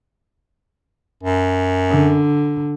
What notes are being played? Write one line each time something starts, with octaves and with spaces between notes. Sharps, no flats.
F#2
D3